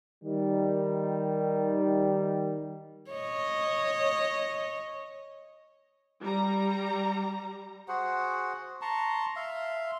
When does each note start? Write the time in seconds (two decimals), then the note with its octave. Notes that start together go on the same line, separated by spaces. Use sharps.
0.23 D#3 G3
3.11 C#5 D#5
6.22 G3 A#5
7.88 F#4 G#4 C5 F#5
8.81 A5 A#5 C6 C#6
9.36 E5 F5 C6